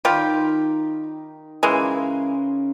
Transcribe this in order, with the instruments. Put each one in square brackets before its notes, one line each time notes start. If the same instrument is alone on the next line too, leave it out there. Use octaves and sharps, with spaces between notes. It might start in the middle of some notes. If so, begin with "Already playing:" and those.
[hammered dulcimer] D#3 D#4 [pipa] G3 F4 G4
[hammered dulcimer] C#3 A#4 C6 [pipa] E3 G#3